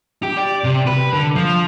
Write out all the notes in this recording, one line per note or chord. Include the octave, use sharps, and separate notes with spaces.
G4
D5
C3
B4
D3
F3